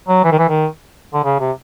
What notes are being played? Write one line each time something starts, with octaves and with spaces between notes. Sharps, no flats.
F#3
E3
D#3
E3
D#3
D3
C#3
C3